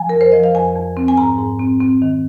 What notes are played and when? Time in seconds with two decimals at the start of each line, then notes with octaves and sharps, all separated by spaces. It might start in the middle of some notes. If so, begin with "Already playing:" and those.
Already playing: F3 G#5
0.09 F2 A#4
0.21 C5
0.32 F3 D#5
0.44 F5
0.55 F2 G#5
0.76 F2
0.97 C4
1.08 G#5
1.17 G#2 A#5
1.38 G#2
1.59 C4
1.81 C4
2.02 D#3